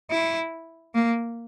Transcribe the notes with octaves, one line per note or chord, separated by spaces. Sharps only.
E4
A#3